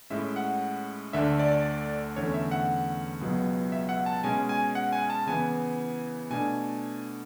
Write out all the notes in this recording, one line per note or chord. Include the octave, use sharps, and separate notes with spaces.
A2 G#3 C#4 E4 E5
F#5
D2 D3 A3 D4 E5
D5
E2 D3 A3 C#4 C#5
E5
F#5
C#2 B2 F#3 B3
E5
F#5
A5
B2 G#3 C#4 G#5
G#5
F#5
G#5
A5
C#3 E3 B3 E4 G#5
B2 A3 D4 G#5